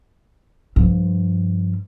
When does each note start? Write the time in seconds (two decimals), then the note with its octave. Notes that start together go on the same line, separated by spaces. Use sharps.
0.76 G2 F3